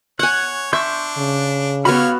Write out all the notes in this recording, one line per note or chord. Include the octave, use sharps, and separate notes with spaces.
C#5 F#5 G#5 F#6
D4 E5 C6 C#6 G6
C#3
G3 B3 F#4 C#5 F5 F#5 B5 F6